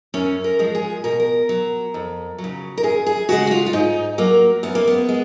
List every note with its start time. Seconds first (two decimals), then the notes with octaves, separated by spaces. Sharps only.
0.14 F#2 C#4
0.44 A#4
0.59 F3 G#3
0.75 G#4
1.04 B2 A#4
1.20 A#4
1.49 F#3
1.94 F2
2.38 F#3
2.44 C#3
2.78 A#4
2.83 F#2 G#4
3.06 G#4
3.29 C#3 G#3 F#4
3.47 F#4
3.51 F4
3.66 F4
3.73 G#2 D#4
4.18 F#3 A#3
4.63 F#2 B3
4.75 A#3
4.88 B3
5.09 G#3